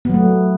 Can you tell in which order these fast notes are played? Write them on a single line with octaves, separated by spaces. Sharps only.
B3 F#3 A3